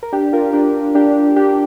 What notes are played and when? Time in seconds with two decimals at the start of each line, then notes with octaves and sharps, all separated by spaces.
0.03 A#4
0.12 D4 G4
0.33 F4 A#4
0.53 D4 G4
0.95 D4 G4
1.36 D4 G4